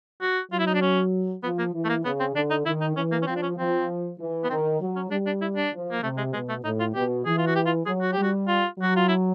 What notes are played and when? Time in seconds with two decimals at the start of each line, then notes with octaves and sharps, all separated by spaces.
0.21 F#4
0.51 F#3 F4
0.59 E4
0.67 D#4
0.74 D4
0.81 C#4
1.43 F3 B3
1.59 A#3
1.74 E3
1.85 A3
1.89 A#3
2.05 C#3 B3
2.20 C4
2.35 D3 D4
2.50 D#4
2.66 D#3 E4
2.81 D#4
2.96 E3 C#4
3.12 A#3
3.22 C#4
3.26 F3 C4
3.36 D4
3.42 C#4
3.58 F3 C4
4.19 E3
4.44 B3
4.50 D#3 C4
4.80 F#3
4.96 C#4
5.10 G3 D4
5.26 D4
5.41 E4
5.56 D4
5.72 F3
5.91 A#3
6.02 C3 A3
6.17 G#3
6.33 B2 G#3
6.49 A3
6.64 A2 D#4
6.80 F4
6.95 B2 G4
7.25 E3 G#4
7.38 F4
7.47 F#4
7.55 G4
7.66 F4
7.86 F#3 G#4
8.01 F#4
8.12 G3 G4
8.23 F#4
8.48 F4
8.79 F#3 F#4
8.96 F4
9.08 E4